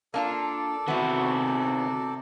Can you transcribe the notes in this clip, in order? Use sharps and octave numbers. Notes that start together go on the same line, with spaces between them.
A#3 D4 F4 A4 D5
C3 D#3 B3 E4 F#4